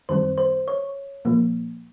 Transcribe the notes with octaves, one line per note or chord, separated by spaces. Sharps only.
F#2 D#3 G3 C4 C5
C5
C#5
A#2 F3 A#3